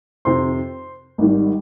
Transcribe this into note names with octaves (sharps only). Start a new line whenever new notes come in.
F2 C3 D#3 C5 C6
G#1 G#2 D#3 G3